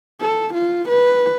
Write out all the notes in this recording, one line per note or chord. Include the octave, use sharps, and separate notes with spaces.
A4
F4
B4